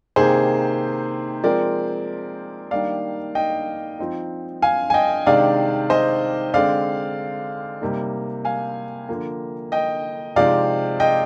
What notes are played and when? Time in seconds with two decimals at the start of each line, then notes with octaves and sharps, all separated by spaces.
0.16 C3 D#3 A#3 D#4 G#4 C5
1.44 F3 G#3 C4 A#4 D5
2.71 D#3 G3 A#3 D4 D5 F5
3.35 D#5 G5
3.99 F3 C4 D#4
4.62 F5 G#5
4.90 G#5
4.94 D#5 G5
5.26 C3 D#3 G#3 D4 D5 F5
5.90 C5 D#5
6.54 D3 G#3 C4 D5 F5
7.81 C3 G3 A#3 D#4
8.45 F5 G#5
9.09 D3 F3 A#3
9.72 D#5 G5
10.36 C3 F3 G#3 C4 D#4 D5 F5
11.00 D#5 G5